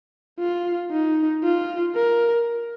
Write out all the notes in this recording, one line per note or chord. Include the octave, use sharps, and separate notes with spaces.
F4
D#4
F4
A#4